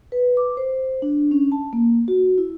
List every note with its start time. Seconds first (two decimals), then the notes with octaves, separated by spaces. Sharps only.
0.12 B4
0.37 D6
0.57 C5
1.02 D4
1.31 C#4
1.52 A5
1.73 A#3
2.08 F#4
2.38 E4